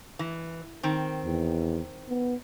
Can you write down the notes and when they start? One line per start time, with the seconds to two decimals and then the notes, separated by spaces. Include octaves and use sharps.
0.19 E3
0.83 D#3 C4
1.25 E2
2.09 B3